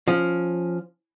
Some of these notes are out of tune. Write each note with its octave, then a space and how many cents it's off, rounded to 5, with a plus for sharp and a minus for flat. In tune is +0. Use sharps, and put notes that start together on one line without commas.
F3 +0 C#4 -10